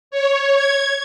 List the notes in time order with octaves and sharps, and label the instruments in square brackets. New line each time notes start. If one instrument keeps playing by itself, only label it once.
[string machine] C#5
G#6